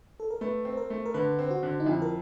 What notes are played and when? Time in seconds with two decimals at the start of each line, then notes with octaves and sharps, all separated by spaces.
0.20 A4
0.31 A#4
0.41 A3 B4
0.65 C4
0.77 A#4
0.90 A3
1.06 A#4
1.14 D3 B4
1.39 C4
1.51 F#4
1.63 D3
1.80 D#4
1.86 F2 E4
2.02 A#4